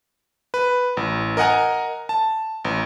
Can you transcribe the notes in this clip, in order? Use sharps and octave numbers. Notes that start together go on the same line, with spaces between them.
B4
A1
A#4 D#5 F#5 G#5 A#5
A5
A1